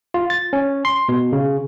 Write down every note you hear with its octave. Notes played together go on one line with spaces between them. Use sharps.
F4
A6
C#4
C6
B2
C#3